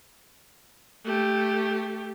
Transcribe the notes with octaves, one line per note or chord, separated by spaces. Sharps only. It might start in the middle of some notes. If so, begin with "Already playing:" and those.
A3 G4